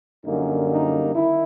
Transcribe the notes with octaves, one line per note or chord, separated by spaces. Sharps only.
F#2 D3 G3 A#3 D#4
D#4
D#3 E4